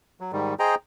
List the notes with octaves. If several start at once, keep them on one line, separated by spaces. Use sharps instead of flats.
F#3
G#2 D#3 G3
G#4 C5 D#5 G5 A#5